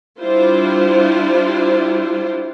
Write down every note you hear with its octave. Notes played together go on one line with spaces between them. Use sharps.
G3 D4 E4 F4 C5